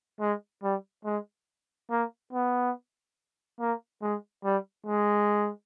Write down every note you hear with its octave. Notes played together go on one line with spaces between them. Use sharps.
G#3
G3
G#3
A#3
B3
A#3
G#3
G3
G#3